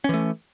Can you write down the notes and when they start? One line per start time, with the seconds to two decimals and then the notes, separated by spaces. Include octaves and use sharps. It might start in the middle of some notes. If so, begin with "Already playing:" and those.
0.04 C#4
0.09 E3
0.14 A3